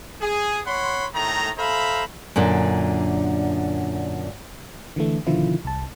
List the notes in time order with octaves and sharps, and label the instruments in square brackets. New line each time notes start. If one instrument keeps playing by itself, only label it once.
[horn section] G#4
C#5 F#5 B5 C6
A2 D#3 A3 A#5
A4 C5 E5 F5 A#5 B5
[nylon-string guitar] F#2 A#2 D3 D4
[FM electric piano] D3 E3 A3
B2 D3 D#3 F3 E4 F4
C2 A5